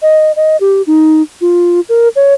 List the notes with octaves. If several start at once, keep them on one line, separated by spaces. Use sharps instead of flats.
D#5
D#5
G4
D#4
F4
A#4
C#5